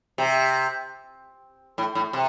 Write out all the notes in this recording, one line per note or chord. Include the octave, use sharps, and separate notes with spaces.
C3
A2
A2
C3